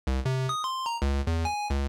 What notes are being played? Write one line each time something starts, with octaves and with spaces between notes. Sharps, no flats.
C2
C3
D#6
C6
A#5
C#2
E2
G#5
C#2